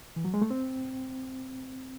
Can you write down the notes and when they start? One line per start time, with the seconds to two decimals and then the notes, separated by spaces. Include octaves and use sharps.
0.16 E3
0.25 F#3
0.34 G#3
0.42 A3
0.50 C4